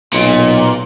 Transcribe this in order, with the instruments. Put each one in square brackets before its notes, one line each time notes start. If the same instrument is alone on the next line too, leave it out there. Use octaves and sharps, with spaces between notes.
[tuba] B1 [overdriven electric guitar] A#2